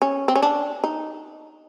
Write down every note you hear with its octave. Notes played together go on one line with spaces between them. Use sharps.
C#4
C4
C#4
D4
D#4